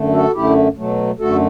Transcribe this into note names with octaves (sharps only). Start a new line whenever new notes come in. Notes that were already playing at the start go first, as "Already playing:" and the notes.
Already playing: F#2 D3 A3
F#4 A4
F#2 D3 A3 E4 G4
B2 F#3 A3
F#2 D3 A3 F#4 A4